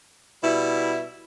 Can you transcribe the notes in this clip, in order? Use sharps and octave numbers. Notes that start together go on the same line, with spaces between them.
B2 G3 E4